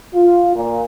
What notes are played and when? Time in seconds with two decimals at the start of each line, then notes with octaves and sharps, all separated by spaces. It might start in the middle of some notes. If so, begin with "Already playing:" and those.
0.15 F4
0.56 A#2